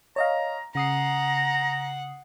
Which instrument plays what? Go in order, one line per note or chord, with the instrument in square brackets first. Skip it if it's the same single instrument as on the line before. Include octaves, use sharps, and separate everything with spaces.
[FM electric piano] C#5 D#5 F5 [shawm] A#5
[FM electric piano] C#3 D#6 C7 [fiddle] F#5 [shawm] A#5